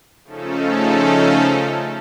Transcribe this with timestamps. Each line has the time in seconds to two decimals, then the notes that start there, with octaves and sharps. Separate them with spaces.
0.24 C#3 F3 A3 C#4 D#4 A4